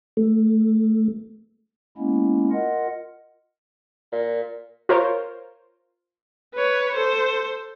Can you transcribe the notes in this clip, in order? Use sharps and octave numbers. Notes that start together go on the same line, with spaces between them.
A3
G#3 A#3 B3 C#4 E4
F4 A#4 D#5 F#5
A#2
F4 A#4 C5 C#5
B4 C#5
A4 C5